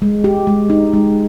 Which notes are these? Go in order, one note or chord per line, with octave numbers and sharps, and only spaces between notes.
G#3
G4
G#3
D#4
G#3